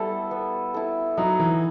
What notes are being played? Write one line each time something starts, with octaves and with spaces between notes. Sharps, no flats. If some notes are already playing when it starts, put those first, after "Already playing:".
Already playing: G3 B3 E4 A4
B3
E4 A4
F#3 D#4
E3